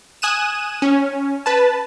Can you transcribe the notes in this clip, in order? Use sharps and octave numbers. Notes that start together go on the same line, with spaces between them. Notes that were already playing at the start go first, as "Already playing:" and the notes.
G#5 D#6 F#6 D#7 E7
C#4
B4 A5